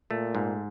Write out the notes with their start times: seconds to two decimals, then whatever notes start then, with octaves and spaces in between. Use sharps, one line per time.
0.10 A#2 A3
0.35 G#2